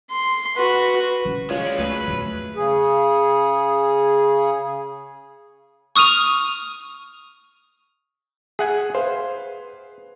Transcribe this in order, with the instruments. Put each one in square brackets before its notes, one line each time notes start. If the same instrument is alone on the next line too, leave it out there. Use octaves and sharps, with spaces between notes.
[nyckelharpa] C6
F#4 B4
[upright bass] C#3 E3
[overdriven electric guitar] G#3 C#4 [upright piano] F4 C#5
[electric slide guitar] D5
[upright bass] C#2 [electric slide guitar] F#3 A3 G#4 [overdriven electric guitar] B4
[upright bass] E2
[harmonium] C#3 G#4
[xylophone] C#6 D#6 F6 D#7 F7
[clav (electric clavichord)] G#4 F#5 G#5 [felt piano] E5
[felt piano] G#4 B4 F5 [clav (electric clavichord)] C5